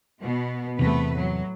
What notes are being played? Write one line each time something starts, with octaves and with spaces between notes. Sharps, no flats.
B2 B3
E2 C3 A3 B3 B4
A2 F#3